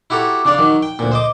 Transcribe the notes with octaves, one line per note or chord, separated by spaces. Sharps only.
E4 F#4 G4 A4 A#5
C#3 D4 D5 F5
D#3 F#3
G5
D2 A#2
C5 D#5 D6